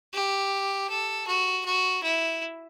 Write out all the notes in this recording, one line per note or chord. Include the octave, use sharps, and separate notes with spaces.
G4
A4
F#4
F#4
E4